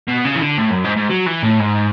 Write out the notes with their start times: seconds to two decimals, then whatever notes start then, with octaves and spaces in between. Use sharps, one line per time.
0.08 B2
0.25 C#3
0.35 E3
0.42 D3
0.58 A2
0.71 F#2
0.84 G#2
0.96 G#2
1.09 F#3
1.26 E3
1.43 A2
1.60 G#2